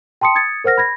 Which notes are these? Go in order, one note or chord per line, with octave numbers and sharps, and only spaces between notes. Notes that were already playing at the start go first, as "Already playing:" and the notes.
G5 A5 C6 D#6 C#7
D#6 G#6 A6 C#7
A#4 C5 F#5 F6 A#6
B5 G#6 A#6